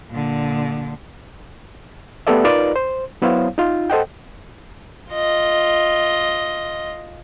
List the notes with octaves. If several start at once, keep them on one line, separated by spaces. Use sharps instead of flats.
A#2 D3
A3 B3 G4 A4 D5 E5
D#4 F4 A#4 B4 D5
C5
F#3 B3 E4 C5 C#5 F5
D#4 F4
A4 C5 D#5 F#5 G5
F4 D#5